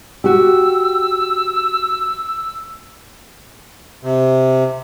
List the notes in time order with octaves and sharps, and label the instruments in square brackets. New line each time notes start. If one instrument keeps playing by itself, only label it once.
[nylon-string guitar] F#4 G4 [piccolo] E6
[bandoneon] C3